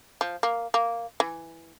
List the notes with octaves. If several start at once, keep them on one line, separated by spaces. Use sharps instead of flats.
F3
A#3
A#3
E3